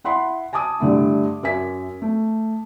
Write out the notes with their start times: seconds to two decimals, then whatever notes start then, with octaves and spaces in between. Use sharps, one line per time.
0.04 E4 F#5 B5 C6
0.53 G#5 A5 D6 D#6
0.80 G2 D3 A3 E4
1.43 F#2 A#4 E5 G#5 B6
2.02 A3